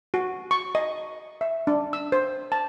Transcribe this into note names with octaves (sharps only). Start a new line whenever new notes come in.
F#4
C#6
D#5
E5
D4
E6
C5
A5